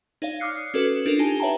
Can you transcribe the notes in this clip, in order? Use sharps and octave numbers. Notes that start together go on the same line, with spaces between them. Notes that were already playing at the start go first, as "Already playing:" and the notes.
D#4 C#5 D5 F5
D6 D#6 F6 F#6 C7 C#7
C#4 F#4 A4 B4
D4 F4 A4 A#4
D#4 G4 G#5 A5
B4 C#5 E5 G5 A5 A#5